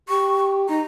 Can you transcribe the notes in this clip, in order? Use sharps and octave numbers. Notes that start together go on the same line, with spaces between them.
G4 C#6
D#4 A#5